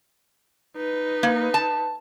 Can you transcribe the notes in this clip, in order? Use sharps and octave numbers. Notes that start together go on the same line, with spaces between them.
D#4 B4
A#3
A5